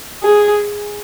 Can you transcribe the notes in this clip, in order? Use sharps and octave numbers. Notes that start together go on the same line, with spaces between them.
G#4